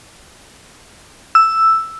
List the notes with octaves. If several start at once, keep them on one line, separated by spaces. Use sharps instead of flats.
E6